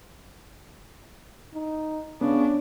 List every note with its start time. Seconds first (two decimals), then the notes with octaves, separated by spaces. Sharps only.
1.54 D#4
2.21 C#3 B3 D4